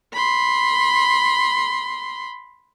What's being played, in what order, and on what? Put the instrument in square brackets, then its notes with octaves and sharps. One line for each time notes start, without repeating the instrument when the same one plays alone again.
[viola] B5 C6